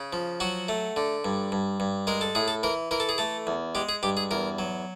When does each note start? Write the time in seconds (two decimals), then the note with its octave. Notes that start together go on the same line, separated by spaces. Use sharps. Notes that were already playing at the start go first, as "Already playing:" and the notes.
Already playing: C#3
0.13 F3
0.40 F#3 F#4
0.69 A3
0.96 D3
1.25 G2
1.52 G2
1.80 G2
2.07 G#3 A#4
2.21 A4
2.35 A2 G#4
2.48 A4
2.63 E3 A#4
2.91 E3 A#4
3.00 A4
3.09 G#4
3.18 A3 A4
3.47 E2
3.75 G#3 G4
3.89 G#4
4.03 G2 G4
4.17 G#4
4.31 E2 A#4
4.59 F#3